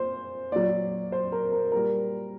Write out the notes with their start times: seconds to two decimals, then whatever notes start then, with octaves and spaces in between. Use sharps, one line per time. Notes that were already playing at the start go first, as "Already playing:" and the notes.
Already playing: A#2 C5
0.52 A#2 F#3 D5
1.12 C5
1.32 A#4
1.52 A#4
1.72 A#2 G3 A#4